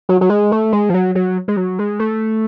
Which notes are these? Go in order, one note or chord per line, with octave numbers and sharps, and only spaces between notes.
F#3
F#3
G#3
A3
G#3
F3
F#3
F#3
G#3
F#3
G#3
A3